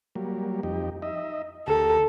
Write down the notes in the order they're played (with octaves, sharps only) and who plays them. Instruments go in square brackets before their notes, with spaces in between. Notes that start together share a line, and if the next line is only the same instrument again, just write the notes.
[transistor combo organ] F#3 G3 A#3
F2 D#4 G4
D#4 D#5 E5
[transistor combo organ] D2 G4 A#4 [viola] A4